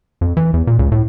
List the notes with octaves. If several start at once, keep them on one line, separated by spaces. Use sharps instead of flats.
F2
E3
E2
A#2
C#2
A2